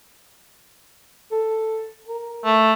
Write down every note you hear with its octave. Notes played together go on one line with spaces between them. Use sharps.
A4
A#4
A3